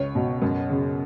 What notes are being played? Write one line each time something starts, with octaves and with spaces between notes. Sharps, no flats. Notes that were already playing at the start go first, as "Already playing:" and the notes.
Already playing: C#2 C#5
B2
F#2
C#3